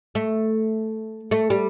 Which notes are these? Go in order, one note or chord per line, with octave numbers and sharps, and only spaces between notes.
A3
A3
G3